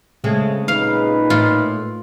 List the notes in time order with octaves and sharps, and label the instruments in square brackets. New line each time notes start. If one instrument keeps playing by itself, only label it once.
[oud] C#3 G#3 C4 [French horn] A3
[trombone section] A#2 B4 [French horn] D#4 [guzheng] F5
[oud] A2 [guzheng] F4